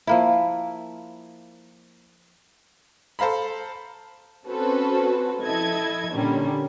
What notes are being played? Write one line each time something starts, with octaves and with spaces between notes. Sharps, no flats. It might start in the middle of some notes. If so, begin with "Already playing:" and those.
F3 A#3 E4
A4 C5 F5 A#5 B5
C4 C#4 F#4 A4 B4 C5
F3 E4 A4 D#5 G#6
A#2 D3 D#3 G3 C#4